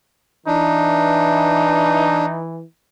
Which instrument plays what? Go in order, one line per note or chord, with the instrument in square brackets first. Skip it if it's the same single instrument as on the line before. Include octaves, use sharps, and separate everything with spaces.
[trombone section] E3 [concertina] D4 [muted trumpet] D#4